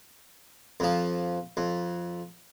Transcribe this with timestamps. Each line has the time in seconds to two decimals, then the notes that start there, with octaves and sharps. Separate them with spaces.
0.80 F2 F3
1.57 F2